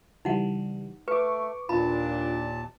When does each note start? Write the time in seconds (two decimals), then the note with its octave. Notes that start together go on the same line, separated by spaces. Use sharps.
0.25 C#3 E3 G3 D#4 F#5
1.08 A3 B4 C#6 D6
1.69 D#2 A#2 D4 F4 A5 B5